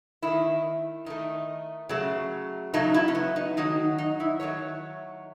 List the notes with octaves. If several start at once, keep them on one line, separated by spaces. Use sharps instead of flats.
D#3 A3 E4
D#3 A3 D#4
C#3 F#3 A3
C#3 F#3 A3 D#4
E4
C#4
B3
D#4
D#3 F#3 A3 D#4
D#4
E4
D#3 F#3 A3 C#5